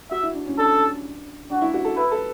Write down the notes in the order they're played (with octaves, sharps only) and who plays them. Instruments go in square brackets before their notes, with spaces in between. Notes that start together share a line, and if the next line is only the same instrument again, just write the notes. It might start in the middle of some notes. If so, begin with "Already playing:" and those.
[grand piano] F#4 [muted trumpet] E5
[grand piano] E4
D4
C#4
[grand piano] D4 [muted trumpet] A4
[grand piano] D4 [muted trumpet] F#4
[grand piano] E4
F#4
A4
[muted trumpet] E4 [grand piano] B4
[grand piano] A4